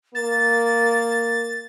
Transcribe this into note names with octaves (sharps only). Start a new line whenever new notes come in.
A#3 A6